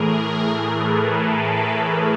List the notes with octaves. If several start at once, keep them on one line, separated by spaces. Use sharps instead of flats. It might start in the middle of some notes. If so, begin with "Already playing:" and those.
Already playing: A2 E3 A3 G#4 A#4
A4 B4